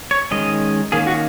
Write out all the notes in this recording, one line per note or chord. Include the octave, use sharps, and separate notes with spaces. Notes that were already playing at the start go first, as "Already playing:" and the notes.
C#5
D#3 G#3 C#4 D#5
D#3 A#3 C#4 G#4
F#4